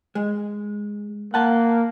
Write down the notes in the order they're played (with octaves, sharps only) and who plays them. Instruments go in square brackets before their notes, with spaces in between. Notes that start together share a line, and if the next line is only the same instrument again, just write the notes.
[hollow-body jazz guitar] G#3
[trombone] A#3 [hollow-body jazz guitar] F#5 A5